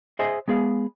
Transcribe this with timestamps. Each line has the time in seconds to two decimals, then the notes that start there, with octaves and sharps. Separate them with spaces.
0.19 G#4 C5 D#5 E5 G#5
0.48 G#3 B3 G#4 F5